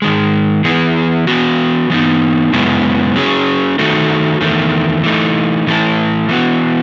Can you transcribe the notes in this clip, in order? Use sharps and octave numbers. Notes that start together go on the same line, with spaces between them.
G#2 D#3 G#3
E3 B3 E4 G#4
E3 B3 F#4
E3 B3 D#4
F#2 C#3 G#3 B3 E4
F#3 C#4 G#4
D#3 A3 D#4 F#4 A4
E2 D#3 A3
E3 A3 D#4
A2 E3 A3 E4 A4
E3 B3 F#4